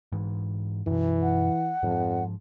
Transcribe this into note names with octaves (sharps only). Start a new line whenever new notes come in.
G#2 E3
F#2 B2 E3
F#5
F2 G#2 F3